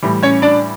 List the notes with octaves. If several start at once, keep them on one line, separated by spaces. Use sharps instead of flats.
A2 E3 G3
C#4 C#5
D4 D5